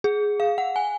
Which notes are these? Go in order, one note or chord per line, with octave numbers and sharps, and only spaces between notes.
G#4
F5
F#5
G#5